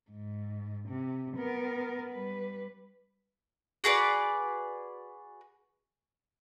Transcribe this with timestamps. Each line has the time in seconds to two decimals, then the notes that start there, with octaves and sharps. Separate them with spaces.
0.11 G#2
0.89 C3
1.37 B3 A#4
2.11 G3 B4
3.84 F#4 G#4 B4 D5